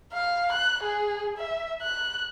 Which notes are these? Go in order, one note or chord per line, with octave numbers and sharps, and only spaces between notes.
F5
F#6
G#4
E5
F#6